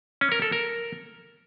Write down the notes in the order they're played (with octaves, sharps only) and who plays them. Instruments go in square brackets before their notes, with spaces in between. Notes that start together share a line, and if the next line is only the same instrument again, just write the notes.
[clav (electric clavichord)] C#4
A#4
A4
A#4